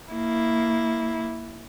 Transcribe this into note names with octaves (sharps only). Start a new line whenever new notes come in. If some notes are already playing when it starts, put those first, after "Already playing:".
A#3 E4